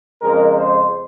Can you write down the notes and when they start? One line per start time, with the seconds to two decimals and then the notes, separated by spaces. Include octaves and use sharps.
0.22 F2 C#3 G#3 A#4
0.57 C5